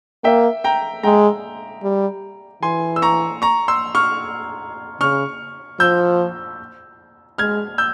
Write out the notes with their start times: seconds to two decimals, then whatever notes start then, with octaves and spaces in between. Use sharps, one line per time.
0.24 A#3 E5 G5
0.64 G5 A#5
1.03 G#3 G5 A#5
1.83 G3
2.62 E3 G#5 C6
2.96 E6
3.02 A#5 C#6
3.42 A#5 C#6
3.68 C6 E6
3.95 C#6 F6
5.00 C#3 C#6 F6
5.80 F3 E6 G6
7.38 G#3 F6 G#6
7.78 E6 G6